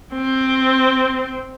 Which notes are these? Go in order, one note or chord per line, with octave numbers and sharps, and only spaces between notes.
C4